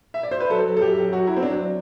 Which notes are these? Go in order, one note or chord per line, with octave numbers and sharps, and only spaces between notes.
E5
D5
C5
B4
F#3 A4
F#3
A4
F#2 G4
F#2
F#3 F#4
F#3 E4
C4
F#3 D4
F#3